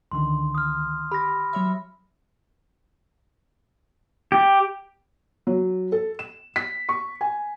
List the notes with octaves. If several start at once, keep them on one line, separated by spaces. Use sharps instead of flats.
C#2 D3 D#3 C6
D#6 F6
G4 B5 A#6
F#3 C#5 E5
G4
F#3
A4
E7
B6
C#6
G#5